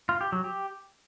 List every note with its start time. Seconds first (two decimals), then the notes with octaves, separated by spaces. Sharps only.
0.09 F4
0.21 G4
0.32 F#3
0.44 G4